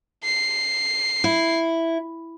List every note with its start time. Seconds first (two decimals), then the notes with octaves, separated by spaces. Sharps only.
0.24 C7
1.24 E4